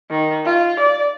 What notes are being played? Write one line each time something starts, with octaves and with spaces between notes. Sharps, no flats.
D#3
F4
D5